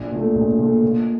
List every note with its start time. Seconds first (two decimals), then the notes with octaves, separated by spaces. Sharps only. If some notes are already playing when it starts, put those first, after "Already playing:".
Already playing: A#1
0.11 A#2 A3
0.35 A#1
0.58 A#2 A3
0.83 A#2